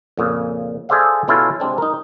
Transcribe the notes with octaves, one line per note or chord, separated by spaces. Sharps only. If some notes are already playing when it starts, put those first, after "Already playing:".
F2 A#2 C#3
G#4 A4 C5 D5 E5 F5
B2 C#4 E4 F4 A4 F5
C3 G#3 C4 D4
D#4 A#4